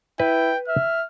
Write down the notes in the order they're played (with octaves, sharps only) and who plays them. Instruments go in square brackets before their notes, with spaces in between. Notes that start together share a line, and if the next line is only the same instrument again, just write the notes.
[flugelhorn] E4 [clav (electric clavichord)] B4 [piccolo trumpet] G5
[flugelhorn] E5 [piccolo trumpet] F6